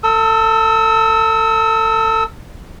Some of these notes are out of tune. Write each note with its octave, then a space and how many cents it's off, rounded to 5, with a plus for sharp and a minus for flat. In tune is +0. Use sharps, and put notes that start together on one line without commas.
A4 +30 E6 -25